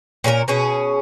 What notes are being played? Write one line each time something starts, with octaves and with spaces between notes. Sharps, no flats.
A#2 C#4 G#4 A#4
B2 C#4 G#4